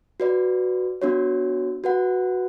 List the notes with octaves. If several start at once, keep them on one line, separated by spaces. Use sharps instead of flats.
F#4 B4 D5
B3 D4 F#4 C#5
F#4 B4 F#5